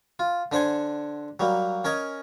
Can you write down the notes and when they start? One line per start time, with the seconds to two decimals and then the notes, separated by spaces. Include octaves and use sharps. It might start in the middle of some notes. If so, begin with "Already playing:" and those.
0.19 F4
0.52 D3 D4 C5 F#5 G#5
1.40 F#3 G3 A#3
1.84 C#4 A#4 D#5 G#5